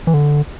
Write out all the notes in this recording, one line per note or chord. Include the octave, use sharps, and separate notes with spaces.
E3
D3